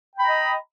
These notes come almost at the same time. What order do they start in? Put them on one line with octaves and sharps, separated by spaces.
G5 B5 A#5 D#5